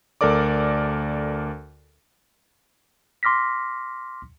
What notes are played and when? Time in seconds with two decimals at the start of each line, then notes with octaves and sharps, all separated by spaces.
0.21 D2 A4 A#4 D5 D6
3.23 C6 D6 F6 A#6 B6